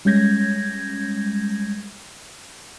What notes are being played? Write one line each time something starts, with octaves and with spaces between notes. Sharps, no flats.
G3 G#3 C#4 G6 G#6 A#6